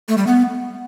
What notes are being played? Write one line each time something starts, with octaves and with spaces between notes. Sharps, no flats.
A3
G3
B3